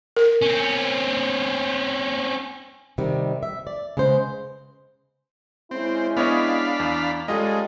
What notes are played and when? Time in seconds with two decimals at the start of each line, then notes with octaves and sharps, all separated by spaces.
0.17 A#4
0.42 C4 C#4
2.98 C3 D#3 G3
3.43 E5
3.67 D5
3.97 C#3 G#3 B3 C5
5.71 G#3 C4 C#4 E4
6.17 B3 D4 C#5 D#5 F5 B5
6.80 E2
7.28 G3 G#3 C#4 F4 A4 D#5